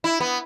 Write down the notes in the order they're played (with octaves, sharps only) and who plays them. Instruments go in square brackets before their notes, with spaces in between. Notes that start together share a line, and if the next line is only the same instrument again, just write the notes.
[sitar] E4
B3